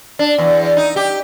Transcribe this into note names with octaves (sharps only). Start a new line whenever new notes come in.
D4
E2
D#4
G4